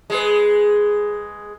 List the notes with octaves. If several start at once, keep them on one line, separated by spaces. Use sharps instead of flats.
G#3 G#4 B4